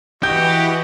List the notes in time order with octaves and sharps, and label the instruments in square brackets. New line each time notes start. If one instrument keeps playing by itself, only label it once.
[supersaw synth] E3 [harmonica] F#4 D#5 [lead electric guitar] G4 [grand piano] G6